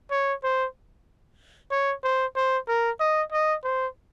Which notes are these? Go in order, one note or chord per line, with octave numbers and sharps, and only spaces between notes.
C#5
C5
C#5
C5
C5
A#4
D#5
D#5
C5